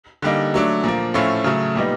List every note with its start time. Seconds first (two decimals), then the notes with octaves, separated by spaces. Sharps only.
0.22 D3 G3 A#3 D#4
0.54 F#3 A3 D4
0.84 A#2 F3 A#3
1.14 A2 F3 A3 C#4 F4
1.44 C#3 F#3 A3
1.75 A#2 G3 B3 D#4